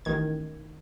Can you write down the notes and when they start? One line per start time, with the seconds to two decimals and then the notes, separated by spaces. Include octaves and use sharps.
0.05 A1 D#3 G#6